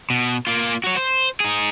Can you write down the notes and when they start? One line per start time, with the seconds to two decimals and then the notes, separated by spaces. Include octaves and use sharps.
0.10 B2
0.47 A#3 F4
0.84 F#4 C#5
0.97 C5
1.40 D#4 G#4